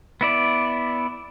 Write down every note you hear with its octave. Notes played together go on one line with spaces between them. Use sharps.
B3 E4 D5